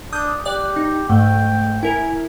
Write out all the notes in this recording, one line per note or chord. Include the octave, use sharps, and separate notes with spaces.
D4 D#6 G6
G4 D5 F#6
D#4
G#2 A3 G5
E4 A#4 G#5